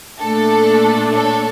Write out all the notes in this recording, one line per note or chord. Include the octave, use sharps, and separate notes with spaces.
A#2 A3 D4 A4
A4 C#5